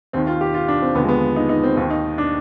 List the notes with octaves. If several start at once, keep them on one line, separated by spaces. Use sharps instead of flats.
D#2 D#3 C4
F4
G4
F4
D4
C4
D#2 D3 F3 B3
G#3
B3
D#4
D#4
C4
D#2 D#3 C4
D#4
D4